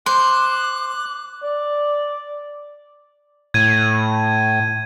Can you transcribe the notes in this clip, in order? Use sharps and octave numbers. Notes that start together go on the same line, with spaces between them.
C5 C6 D6 F#6
D5
A2 G#6 D#7